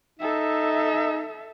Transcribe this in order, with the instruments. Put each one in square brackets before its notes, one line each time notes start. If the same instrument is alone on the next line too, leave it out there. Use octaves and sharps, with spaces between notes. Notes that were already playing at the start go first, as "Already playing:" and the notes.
[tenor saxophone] D#4 [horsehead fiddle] A4 E5